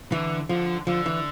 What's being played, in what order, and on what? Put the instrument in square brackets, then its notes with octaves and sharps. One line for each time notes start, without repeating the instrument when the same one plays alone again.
[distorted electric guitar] D3 [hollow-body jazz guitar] E3
[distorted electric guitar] D3 [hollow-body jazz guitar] F3
[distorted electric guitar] D3 [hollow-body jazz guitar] F3
[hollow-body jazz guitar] E3